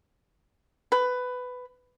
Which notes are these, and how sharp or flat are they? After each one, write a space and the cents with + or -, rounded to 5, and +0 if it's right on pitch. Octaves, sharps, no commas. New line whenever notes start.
B4 +15